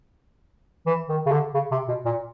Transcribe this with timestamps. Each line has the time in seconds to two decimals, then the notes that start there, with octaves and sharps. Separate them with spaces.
0.86 E3
1.09 D#3
1.26 C#3
1.31 D3
1.54 C#3
1.71 C3
1.88 B2
2.05 A#2